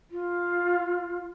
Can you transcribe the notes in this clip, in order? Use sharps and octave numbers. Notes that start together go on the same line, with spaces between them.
F4